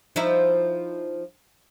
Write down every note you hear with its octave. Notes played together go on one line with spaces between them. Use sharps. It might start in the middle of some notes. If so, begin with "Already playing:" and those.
F3 D#4 E4